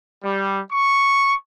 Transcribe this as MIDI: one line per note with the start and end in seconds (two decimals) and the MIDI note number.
0.24 0.59 55
0.71 1.36 85